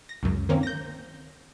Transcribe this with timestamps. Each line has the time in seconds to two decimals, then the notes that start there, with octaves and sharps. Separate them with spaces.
0.09 A#6
0.23 C#2 F#2
0.49 D#3 A#3 C4 C#4
0.63 G6 A#6